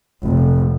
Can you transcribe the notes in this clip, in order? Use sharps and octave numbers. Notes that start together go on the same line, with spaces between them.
F1